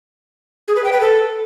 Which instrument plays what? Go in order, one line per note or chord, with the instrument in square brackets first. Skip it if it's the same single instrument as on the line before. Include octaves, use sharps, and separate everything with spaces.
[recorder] G#4
B4
G5
B4
A4